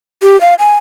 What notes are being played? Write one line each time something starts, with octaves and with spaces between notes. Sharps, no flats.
G4
F5
G#5